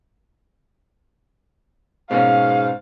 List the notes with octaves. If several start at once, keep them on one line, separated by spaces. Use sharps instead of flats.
G#2 B2 A#3 C#4 F5